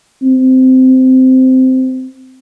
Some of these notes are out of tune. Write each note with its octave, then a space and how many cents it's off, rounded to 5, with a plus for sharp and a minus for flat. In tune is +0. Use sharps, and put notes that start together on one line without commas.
C4 -15